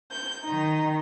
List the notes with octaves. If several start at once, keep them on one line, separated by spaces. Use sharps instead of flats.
G6
D#3 D#4